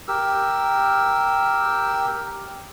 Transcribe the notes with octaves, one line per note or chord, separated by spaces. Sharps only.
G4 A#4 E6